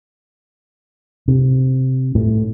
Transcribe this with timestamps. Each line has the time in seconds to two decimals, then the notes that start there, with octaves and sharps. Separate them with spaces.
1.28 C3
2.15 A2